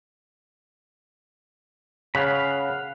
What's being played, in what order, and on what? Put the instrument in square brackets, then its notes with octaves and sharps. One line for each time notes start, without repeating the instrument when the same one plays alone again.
[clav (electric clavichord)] C#3 [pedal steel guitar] F5 F#5 B5